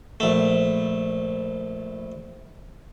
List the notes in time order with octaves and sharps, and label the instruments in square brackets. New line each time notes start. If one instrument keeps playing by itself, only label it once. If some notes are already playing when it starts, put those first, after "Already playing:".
[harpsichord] A#1 A3